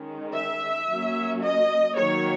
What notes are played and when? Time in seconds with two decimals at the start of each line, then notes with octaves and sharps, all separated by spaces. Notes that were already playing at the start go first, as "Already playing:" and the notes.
Already playing: D#3 G#3 C#4
0.34 E5
0.88 F#3 A#3 C#4
1.41 D#5
1.95 D#3 F#3 A#3 C#5